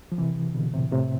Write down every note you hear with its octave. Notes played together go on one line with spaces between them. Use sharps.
F3
C3 E3
B2 D3
A2 C3
A2 C3